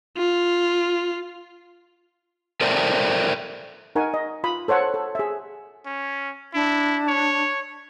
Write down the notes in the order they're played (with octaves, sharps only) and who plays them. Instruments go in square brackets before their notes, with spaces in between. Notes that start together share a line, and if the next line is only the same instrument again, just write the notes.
[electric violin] F4
[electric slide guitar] A4 A#4 C5 D5 E5 G5
[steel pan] D#4 A#4 F#5 G#5 C#6
D#5
F4 B5 D#6
A4 C5 C#5 F#5
A4
G#4 E5
[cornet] C#4
[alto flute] D4 [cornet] E4
[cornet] C#5